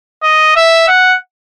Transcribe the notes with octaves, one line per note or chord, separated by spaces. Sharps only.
D#5
E5
F#5